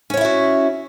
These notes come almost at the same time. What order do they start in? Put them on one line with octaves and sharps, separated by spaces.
C#4 C#5 E4 E5 F#4